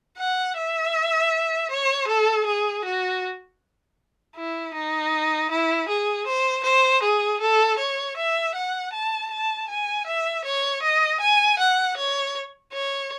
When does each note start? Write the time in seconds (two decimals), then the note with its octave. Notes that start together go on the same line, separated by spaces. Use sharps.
0.19 F#5
0.57 E5
1.71 C#5
2.08 A4
2.47 G#4
2.85 F#4
4.36 E4
4.74 D#4
5.51 E4
5.89 G#4
6.27 C5
6.64 C5
7.03 G#4
7.41 A4
7.79 C#5
8.17 E5
8.55 F#5
8.93 A5
9.31 A5
9.69 G#5
10.07 E5
10.45 C#5
10.83 D#5
11.21 G#5
11.59 F#5
11.97 C#5
12.73 C#5